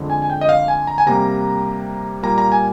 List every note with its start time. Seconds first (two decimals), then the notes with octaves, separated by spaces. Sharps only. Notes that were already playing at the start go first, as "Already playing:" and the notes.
Already playing: F2 D3 G#3
0.10 G#5
0.22 G#5
0.30 G5
0.41 D#5
0.49 F5
0.68 G#5
0.87 A#5
0.98 G#5
1.06 C3 G3 A#3 A#5
2.23 A#2 G3 A#3 A#5
2.38 A#5
2.52 G#5